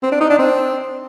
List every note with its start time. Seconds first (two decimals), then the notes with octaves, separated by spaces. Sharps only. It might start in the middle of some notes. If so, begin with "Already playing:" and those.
0.03 C4
0.12 D4
0.21 D#4
0.30 D4
0.39 C4